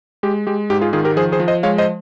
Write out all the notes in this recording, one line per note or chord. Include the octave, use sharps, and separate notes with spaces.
G#3 G4
G#3 G4
G#2 G4
F4 G#4
D#3 F4 G#4
G4 A#4
F3 G#4 C5
G#4 C5
F3
C5 D#5
G#3 C#5 F5
C5 D#5